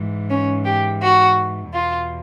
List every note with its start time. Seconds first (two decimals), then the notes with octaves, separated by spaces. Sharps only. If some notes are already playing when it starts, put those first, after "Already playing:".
Already playing: G#2 E3
0.29 C#4
0.64 G4
1.01 F#4
1.73 E2 B2 F4